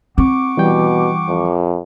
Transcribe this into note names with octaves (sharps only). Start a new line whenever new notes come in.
C4 F#5 C#6 D6
B2 E3 G3 G5
F2